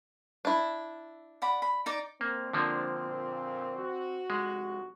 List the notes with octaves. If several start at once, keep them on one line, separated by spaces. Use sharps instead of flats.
D4 E4
D5 F#5 B5
B5
D#4 D5 D6
A#3 C4
D3 F3 A#3 D4
A#2
F#4
F1 G#3